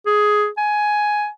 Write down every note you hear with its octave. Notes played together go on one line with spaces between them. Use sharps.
G#4
G#5